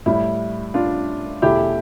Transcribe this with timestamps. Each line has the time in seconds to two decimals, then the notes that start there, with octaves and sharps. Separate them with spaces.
0.06 A2 G3 E4
0.74 D4 F4
1.42 E2 B2 A3 E4 G4